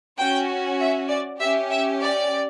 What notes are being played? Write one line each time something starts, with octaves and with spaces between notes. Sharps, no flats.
C#4 F#4 G5
E5
D5
C#4 G4 E5
E5
D5